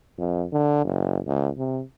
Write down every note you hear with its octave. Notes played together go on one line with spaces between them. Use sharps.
F2
D3
F#1
C#2
C3